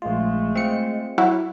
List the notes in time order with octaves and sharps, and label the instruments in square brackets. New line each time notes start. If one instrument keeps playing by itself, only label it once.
[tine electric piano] A#1 F4 [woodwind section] G#3 A3
[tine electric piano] C4 F4 C#7
[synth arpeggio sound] F#3 E4 F#4